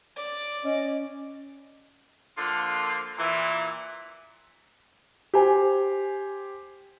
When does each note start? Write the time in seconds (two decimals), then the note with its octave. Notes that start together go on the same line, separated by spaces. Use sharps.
0.16 D5
0.64 C#4 D#5
2.37 D3 F3 A#3 F4
3.18 A#2 E3
5.34 G4 C5 G#5